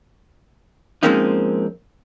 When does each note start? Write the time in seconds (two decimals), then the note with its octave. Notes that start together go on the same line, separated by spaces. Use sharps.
1.03 F3 G#3 A#3 C4 C#4 D#4